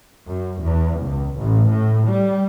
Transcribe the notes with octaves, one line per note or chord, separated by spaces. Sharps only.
F#2
E2
C#2
A1
A2
G3